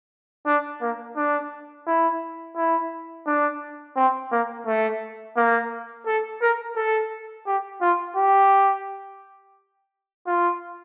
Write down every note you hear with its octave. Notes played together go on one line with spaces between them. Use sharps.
D4
A#3
D4
E4
E4
D4
C4
A#3
A3
A#3
A4
A#4
A4
G4
F4
G4
F4